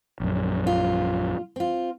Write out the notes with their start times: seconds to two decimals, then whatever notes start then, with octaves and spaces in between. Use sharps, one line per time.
0.20 A#1 F#2
0.67 F4
1.56 C4 F4